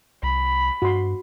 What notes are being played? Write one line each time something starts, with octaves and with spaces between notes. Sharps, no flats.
C2 B5
G2 F#4 C6